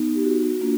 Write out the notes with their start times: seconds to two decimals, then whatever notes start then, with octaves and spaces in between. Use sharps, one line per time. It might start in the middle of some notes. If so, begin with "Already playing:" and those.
Already playing: B3 D#4
0.15 G4
0.24 F#4
0.61 A#3 D4 F4